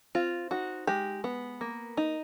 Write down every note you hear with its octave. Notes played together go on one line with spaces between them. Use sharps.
C4 F4
D#4 F#4
G#3 G4
B3
A#3
D#4